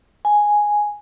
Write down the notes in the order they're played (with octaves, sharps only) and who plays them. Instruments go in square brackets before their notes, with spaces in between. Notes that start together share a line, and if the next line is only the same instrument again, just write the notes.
[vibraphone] G#5